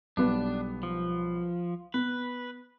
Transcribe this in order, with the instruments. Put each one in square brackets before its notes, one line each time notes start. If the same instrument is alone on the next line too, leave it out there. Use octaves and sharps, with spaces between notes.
[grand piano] B1 G3 B3 [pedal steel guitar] D4
[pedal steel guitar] F3
[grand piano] B3 [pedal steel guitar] B4